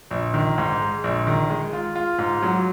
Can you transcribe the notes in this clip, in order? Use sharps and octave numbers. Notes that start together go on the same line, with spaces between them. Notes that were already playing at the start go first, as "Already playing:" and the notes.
A#1
D#3
G#2
G#3
A#1
D#3
G#3
F4
F4
G#2
F#3